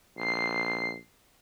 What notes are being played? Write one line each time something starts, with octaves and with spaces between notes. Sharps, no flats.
A#1 C7